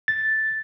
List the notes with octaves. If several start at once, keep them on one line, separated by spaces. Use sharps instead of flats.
A6